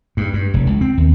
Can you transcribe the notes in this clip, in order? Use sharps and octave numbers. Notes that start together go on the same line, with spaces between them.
G2
G2
F1
C#2
C4
D#2